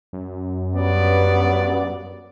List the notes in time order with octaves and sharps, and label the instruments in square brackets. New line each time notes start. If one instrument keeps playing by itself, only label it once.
[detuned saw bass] F#2
[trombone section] G2 F#3 B3 [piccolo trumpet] D5